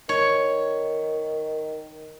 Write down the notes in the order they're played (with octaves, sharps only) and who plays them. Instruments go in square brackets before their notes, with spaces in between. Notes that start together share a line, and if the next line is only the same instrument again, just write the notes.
[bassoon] D#3 [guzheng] C#5